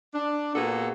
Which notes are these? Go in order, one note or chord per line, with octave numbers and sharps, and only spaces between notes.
D4
A#2 B3 F#4 G#4 A4